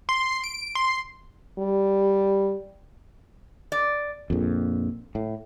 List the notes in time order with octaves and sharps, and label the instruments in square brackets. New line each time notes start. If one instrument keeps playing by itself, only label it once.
[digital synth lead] C6
D7
C6
[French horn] G3
[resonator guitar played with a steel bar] D5
[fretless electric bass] A#1 F2
A2